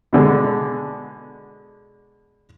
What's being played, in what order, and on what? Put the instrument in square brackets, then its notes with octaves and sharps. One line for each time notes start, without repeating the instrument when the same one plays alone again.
[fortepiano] B2 D3 G#3